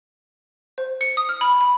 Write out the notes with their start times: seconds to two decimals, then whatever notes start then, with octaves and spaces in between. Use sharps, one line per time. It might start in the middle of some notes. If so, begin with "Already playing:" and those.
0.78 C5
1.01 C#7
1.17 D#6
1.29 F6
1.41 B5
1.61 B5